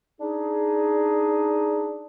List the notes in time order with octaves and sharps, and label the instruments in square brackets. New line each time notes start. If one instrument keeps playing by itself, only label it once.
[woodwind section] D4 D#4 G#4